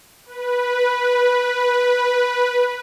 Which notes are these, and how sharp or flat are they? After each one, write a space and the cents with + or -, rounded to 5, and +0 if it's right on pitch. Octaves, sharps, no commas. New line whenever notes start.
B4 -10